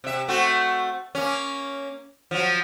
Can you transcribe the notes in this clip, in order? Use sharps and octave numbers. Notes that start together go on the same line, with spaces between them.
C3 E5
A3 C4 F#4
A#3 C#4
F3 F#3